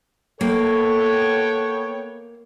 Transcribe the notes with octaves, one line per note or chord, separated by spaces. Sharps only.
A#3 B3 A4 C#5 G5